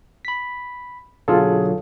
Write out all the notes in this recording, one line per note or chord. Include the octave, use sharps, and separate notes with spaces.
B5 B6
B1 D3 F#3 F4 G#4 A4